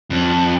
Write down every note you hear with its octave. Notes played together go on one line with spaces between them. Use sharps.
F2